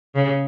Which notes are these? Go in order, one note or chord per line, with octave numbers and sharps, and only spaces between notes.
C#3